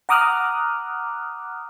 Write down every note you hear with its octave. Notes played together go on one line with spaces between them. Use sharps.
F#5 A#5 D6 D#6 F6 F#6